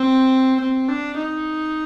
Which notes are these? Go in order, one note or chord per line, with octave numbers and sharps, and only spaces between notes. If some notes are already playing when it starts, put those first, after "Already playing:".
Already playing: C4
C4
D4
D#4